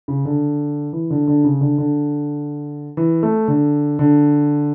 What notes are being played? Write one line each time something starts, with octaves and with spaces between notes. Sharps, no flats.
C#3
D3
E3
D3
D3
C#3
D3
D3
E3
A3
D3
D3